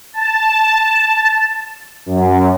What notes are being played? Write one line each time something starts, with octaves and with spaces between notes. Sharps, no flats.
A5
F#2